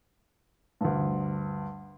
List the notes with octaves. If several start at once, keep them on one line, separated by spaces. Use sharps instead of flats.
D2 G2